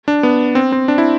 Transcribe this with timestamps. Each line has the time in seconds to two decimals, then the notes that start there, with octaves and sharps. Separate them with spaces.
0.08 D4
0.23 B3
0.55 C4
0.72 C4
0.88 D4
0.98 E4